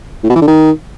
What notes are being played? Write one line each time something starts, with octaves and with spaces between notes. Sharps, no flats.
A2
B2
E3
D3
D#3